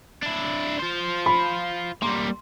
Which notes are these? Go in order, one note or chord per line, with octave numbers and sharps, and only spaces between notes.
D4 E4
F4 C5
B5
G3 A#3 C6